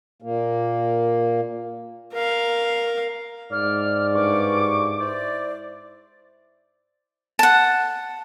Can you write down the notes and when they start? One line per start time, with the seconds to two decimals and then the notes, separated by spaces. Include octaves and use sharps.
0.22 A#2 A#3
2.13 A#4 F5
3.52 G#2 D5 F6
4.14 G2 C#6 D6
5.00 E4 C5 D5
7.39 F#5 A5